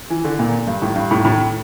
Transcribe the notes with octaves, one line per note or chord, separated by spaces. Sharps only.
E3
D3
A#2
G2
A2
G2
A2
A2